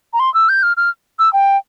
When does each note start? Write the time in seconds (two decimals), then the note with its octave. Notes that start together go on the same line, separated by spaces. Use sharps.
0.13 A#5
0.19 C6
0.34 E6
0.49 G6
0.63 F6
0.77 F6
1.19 E6
1.33 G5